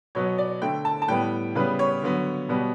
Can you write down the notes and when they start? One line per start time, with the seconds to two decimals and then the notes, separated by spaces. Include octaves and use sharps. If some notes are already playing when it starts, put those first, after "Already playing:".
0.15 B2 F#3 B3 C#5
0.38 D5
0.62 D3 A3 G5
0.85 A5
1.02 A5
1.08 A2 G3 B3 G5
1.55 C#3 G3 B3 B4
1.79 C#5
2.02 D3 F#3 B3
2.49 B2 G3 B3